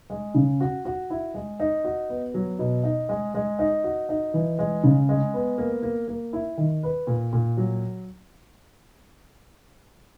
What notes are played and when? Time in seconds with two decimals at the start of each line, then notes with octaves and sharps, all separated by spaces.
0.10 G#3
0.35 C#3
0.60 F#4
0.85 F#4
1.10 E4
1.34 G#3
1.60 D#4
1.84 F#4
2.09 B3
2.34 F#3
2.59 B2
2.84 D#4
3.09 G#3
3.34 G#3
3.59 D#4
3.84 F#4
4.09 D#4
4.34 E3
4.59 G#3
4.84 C#3
5.09 G#3
5.34 B3
5.58 A#3
5.83 A#3
6.08 A#3
6.33 E4
6.58 D#3
6.83 B4
7.07 A#2
7.33 A#2
7.57 F#3